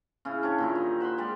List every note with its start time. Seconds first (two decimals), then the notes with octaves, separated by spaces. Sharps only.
0.25 C#3 C#4 E4
0.43 D4 G4 C#5
0.58 A#2 D#3 E4
0.75 D#4
1.00 E5 F#5 B5 C6
1.18 G3 G#3 G4 D5